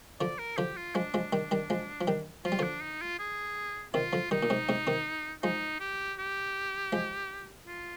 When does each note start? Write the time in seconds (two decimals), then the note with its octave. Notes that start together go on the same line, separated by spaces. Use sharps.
0.20 D3 F3 D5
0.39 A#4
0.57 D3 F3 G4
0.76 F4
0.95 F3 G#3 D4
1.14 F3 G#3
1.33 D#3 G3
1.51 D#3 G3
1.70 F3 G#3
2.01 F3
2.08 D#3 G3
2.45 F3 F4
2.52 G3
2.59 D3 F3 D4
2.82 D#4
3.01 F4
3.19 G#4
3.94 C3 D#3 F4
4.13 D3 F3
4.31 D#3 G3 D#4
4.43 A#2
4.50 G#2 C3
4.69 G#2 C3
4.87 C3 D#3
5.43 F3 G#3 D#4
5.80 G4
6.19 G4
6.92 F3 G#3
7.67 F4